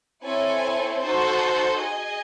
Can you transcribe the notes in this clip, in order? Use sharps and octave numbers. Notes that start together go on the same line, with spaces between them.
C4 E4 A4 C#5 G#5
D#4 F#4 A4 C5
G#4 D#5 G#5